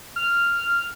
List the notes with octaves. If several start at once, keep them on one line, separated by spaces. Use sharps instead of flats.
F6